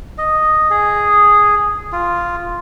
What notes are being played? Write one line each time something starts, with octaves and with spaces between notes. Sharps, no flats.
D#5
G#4
F4